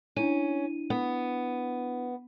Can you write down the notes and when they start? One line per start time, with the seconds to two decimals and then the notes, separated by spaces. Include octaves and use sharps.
0.16 C#4 D4 E4 D#7
0.90 B3